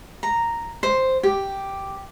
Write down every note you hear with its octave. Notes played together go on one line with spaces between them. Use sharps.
A#5
C5
G4